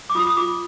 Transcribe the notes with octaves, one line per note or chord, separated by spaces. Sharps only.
D6
F4 D#6
D#6
F4 D6